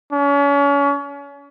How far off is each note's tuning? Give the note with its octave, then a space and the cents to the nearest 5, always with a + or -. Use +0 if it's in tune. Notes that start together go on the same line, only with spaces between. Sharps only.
C#4 +35